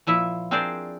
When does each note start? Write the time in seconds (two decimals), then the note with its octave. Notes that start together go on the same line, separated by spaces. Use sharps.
0.07 A#2 F3 E4 E5
0.51 C4 D4 G#4 A#4 C5 D5